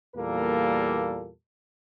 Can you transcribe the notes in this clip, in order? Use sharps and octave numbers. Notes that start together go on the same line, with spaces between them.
E2 A#2 G3 A#3 A4 A#4